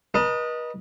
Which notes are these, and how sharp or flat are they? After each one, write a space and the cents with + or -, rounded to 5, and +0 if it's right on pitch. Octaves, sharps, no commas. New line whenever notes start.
B4 -40 D#5 +0 A5 +40